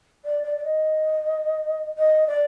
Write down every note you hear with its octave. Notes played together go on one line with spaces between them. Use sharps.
D5
D5
D5
D#5
D#5
D5